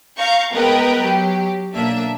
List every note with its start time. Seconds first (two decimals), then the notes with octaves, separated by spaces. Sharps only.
0.18 F5 A#5 C#6 G6
0.54 G#3 B3 A#4 B4 D#5 G5
1.03 F#3 G4
1.74 B1 A#3 D4 E5